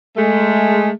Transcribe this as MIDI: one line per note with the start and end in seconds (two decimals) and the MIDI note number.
0.17 0.90 56
0.17 0.90 57